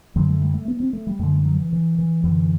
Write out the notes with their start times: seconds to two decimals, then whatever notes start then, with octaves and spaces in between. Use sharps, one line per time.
0.16 F#2 D3 F#3
0.29 A3
0.41 G3
0.54 A3
0.68 B3
0.80 C4
0.93 A3
1.07 G3
1.19 F#2 D3 A3
1.33 G3
1.45 F#3
1.59 E3
1.73 E3
1.98 E3
2.24 F#2 D3 E3